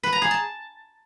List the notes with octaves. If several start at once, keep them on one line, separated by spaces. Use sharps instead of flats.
B4
A#5
G#4
A5